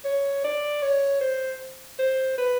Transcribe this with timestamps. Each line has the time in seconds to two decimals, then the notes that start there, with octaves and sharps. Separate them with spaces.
0.05 C#5
0.44 D5
0.83 C#5
1.21 C5
1.99 C5
2.38 B4